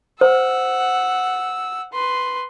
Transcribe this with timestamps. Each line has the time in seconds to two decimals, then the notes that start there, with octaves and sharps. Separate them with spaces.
0.21 C5 F#5 E6
1.93 B4 C6